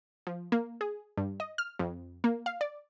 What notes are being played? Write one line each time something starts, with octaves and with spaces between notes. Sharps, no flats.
F3
A#3
G#4
G2
D#5
F6
F2
A#3
F5
D5